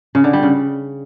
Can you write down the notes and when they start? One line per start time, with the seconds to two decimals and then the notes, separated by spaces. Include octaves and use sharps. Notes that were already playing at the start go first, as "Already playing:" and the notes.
0.15 C#3
0.24 D3
0.33 G3
0.43 C#3